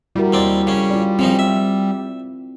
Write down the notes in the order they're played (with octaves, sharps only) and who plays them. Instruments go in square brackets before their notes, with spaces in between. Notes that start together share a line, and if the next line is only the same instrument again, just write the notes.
[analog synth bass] G3 [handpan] E4 F#4 A#4
[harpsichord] D#2 C4 D5
C#3 C#4
[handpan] F4 D5
[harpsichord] C#3 F3 D#4 [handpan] C4
[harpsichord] E5